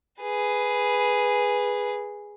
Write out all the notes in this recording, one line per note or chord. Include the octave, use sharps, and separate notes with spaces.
G#4 B4